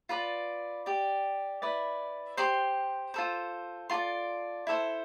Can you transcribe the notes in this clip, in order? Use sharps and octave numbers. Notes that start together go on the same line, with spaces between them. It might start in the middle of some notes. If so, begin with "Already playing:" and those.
F4 B4 D5
G4 D5
E4 B4 D5
G4 C5 C6
F4 A4 C5
F4 A4 D5 C6
E4 A4 C5